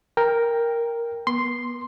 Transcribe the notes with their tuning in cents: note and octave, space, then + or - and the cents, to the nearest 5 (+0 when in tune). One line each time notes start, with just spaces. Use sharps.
A#4 +0 G5 +10
B3 -30 C6 +0